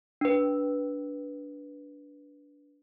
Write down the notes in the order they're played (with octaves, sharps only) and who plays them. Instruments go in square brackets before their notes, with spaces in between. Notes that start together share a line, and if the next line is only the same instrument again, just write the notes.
[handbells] D4 B4